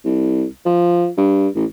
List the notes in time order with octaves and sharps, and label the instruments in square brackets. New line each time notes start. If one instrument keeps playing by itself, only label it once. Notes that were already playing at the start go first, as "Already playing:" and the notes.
[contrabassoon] C2
F3
G2
A1